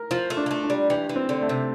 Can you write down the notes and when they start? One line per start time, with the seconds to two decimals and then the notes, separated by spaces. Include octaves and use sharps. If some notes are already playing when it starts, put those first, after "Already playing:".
Already playing: A#4
0.11 F3 F4
0.30 A3
0.37 D4
0.46 A#3
0.51 A3
0.64 D4
0.70 G3
0.90 E3 G4
1.09 E3
1.16 C4
1.29 D3
1.42 A3
1.49 C3